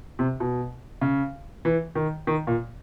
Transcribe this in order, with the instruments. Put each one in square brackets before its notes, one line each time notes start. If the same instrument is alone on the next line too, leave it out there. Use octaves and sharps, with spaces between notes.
[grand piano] C3
B2
C#3
E3
D#3
D#3
A#2